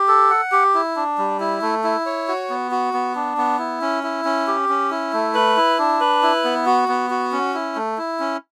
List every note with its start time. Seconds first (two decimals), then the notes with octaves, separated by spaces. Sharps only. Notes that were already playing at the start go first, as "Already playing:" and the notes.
Already playing: G4
0.08 A4
0.30 F#5
0.52 G4
0.74 E4
0.96 D4
1.18 G3
1.40 E4
1.62 A3
1.84 E4
2.06 C#5
2.28 F#4
2.50 B3
2.71 F#4
2.94 B3
3.15 D4
3.37 B3
3.59 E4
3.82 C#4
4.03 E4
4.25 C#4
4.47 G4
4.69 C#4
4.91 E4
5.13 A3
5.34 B4
5.57 E4
5.78 D4
6.00 B4
6.23 E4
6.44 B3
6.66 F#4
6.88 B3
7.10 F#4
7.32 C#4
7.54 E4
7.76 A3
7.98 E4
8.20 C#4